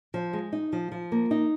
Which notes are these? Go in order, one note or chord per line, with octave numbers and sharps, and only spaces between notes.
F3
G#3
D#4
F3
F3
A#3
D#4